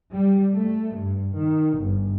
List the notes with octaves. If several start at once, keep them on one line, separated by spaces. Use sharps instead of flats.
G3
A3
G2
D#3
G1